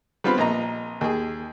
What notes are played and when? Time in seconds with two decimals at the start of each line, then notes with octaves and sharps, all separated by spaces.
0.24 G3 B3 C4 F4 B5
0.38 A#1 D#5 A#5
1.01 D#2 G#4